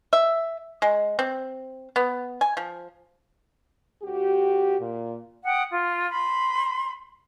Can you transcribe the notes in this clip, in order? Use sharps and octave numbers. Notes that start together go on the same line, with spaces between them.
E5
G#3
C4
B3
G#5
F3
D2 F#4 G4
A#2
F#5 G5 D#6
F4
B5 C6